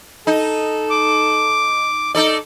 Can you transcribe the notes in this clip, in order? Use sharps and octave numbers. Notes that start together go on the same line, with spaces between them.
D#4 A4
D6
D#4 A4 D5